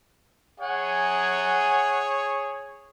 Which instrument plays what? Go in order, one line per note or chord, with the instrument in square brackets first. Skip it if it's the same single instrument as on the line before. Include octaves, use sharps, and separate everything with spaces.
[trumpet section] G#4 C#5 [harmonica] F#5 G#5